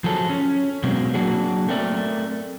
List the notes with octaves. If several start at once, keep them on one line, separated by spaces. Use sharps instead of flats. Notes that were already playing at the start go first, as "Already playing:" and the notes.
F3 F#3 G#4 A4
C#4
B2 F#3 G#3 A#3 C4
F#3 A#3 D4 F#4 G#4
A3 C4 A#4 D5